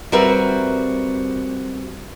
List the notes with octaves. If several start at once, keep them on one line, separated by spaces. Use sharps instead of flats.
G3 C4 F#4 A#4 B4 E5